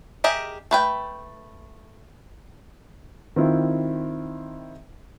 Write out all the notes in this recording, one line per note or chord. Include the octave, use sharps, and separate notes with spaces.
G4 G#4 A#4 D#5 E5
A3 B4 G5
D#3 C4 E4 F4